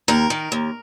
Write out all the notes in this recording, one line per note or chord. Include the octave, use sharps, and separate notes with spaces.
D#2 A#4
D#3
D#2